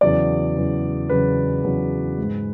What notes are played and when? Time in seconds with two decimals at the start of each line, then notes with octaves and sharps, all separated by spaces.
0.01 E2 C#3 F#3 D5
0.56 E2 C#3 F#3
1.09 E2 C#3 F#3 B4
1.63 E2 C#3 F#3
2.18 G#2 G#3